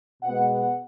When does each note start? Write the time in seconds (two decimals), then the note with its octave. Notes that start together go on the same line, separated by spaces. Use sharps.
0.23 B2 G#3 B3 F#5
0.52 F#5